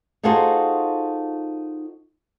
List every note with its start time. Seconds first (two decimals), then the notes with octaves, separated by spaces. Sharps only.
0.23 D#4 F4 F#4 G#4 A4 C5